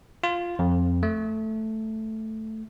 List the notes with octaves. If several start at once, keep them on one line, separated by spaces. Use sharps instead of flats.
F4
F2
A3